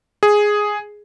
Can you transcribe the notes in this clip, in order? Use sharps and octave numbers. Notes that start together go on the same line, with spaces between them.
G#4